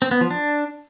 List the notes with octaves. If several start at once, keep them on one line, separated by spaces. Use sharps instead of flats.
C4
B3
F3
D4